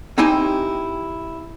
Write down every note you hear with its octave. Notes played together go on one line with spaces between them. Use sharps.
C4 D#4 E4 G4 G#5